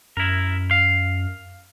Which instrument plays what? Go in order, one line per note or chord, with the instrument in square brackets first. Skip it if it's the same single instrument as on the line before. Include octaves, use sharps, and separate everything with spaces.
[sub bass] F#2 [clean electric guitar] E4 A#4
[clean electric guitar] F5